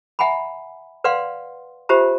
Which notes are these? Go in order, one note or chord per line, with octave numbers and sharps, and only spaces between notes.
E5 F#5 G#5 A#5 B5
B4 D5 F5 F#5 C6
F4 G4 C5 E5 A#5